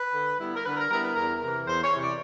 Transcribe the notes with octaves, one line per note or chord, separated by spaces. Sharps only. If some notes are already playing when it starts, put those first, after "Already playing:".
Already playing: B4
D3
G3 B3 E4
A#4
D3 B4
A#4
G3 B3 E4 A#4
B4
E2 A#4
C3 E3 A#4
E2 C5
C#5
C3 E3
D5